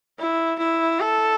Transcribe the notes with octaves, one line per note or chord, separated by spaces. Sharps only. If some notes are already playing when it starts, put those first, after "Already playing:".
E4
E4
A4